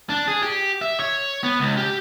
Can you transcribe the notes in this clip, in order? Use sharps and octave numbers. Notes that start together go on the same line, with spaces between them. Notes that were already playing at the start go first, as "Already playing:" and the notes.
D4
G#4
G4
E5
C#5
B3
C#2
G4